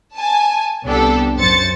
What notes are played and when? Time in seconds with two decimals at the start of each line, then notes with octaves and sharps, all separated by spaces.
0.15 G#5 A5
0.84 C2 B3 D4 G4 A4
1.36 F#2 C5 A6 C#7